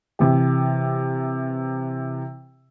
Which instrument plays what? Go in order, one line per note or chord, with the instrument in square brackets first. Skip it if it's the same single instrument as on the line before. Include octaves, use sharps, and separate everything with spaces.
[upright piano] C3 E3 G4